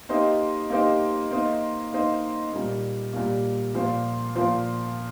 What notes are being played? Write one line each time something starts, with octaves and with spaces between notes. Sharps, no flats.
A#3 D#4 G4 C5 D#5
A#3 D#4 G4 C5 D#5
A#3 D#4 C5 D#5
A#3 D#4 C5 D#5
A#2 G3 A#3
A#2 G3 A#3
A#2 F3 A#3 F4 C5
A#2 F3 A#3 F4 C5